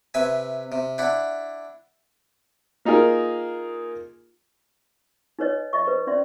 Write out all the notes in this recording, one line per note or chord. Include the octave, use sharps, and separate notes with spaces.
C3 B4 E5 G#5
C3
D4 E4 F#5
A#3 D#4 F4 G#4 A#4
D#4 B4 C#5 D#5
D#5 E5 C#6
B4 C5
C#4 D5 E5 C6